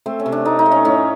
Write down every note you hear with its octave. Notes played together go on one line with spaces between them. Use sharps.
A3 C4
C#4
C3
D4
A3 D#4
D#4
A3
C#4
A2 C#4